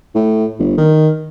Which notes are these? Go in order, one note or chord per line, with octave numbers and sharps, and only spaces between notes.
A2
G1
D#3